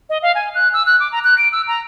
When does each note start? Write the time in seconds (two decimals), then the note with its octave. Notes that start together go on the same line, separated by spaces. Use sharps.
0.10 D#5
0.22 F5
0.35 G#5
0.55 F#6
0.73 E6
0.86 F#6
1.00 D6
1.12 A#5
1.24 F#6
1.38 D7
1.52 E6
1.68 A#5